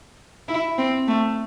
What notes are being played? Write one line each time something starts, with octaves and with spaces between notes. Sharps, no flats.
E4
C4
A3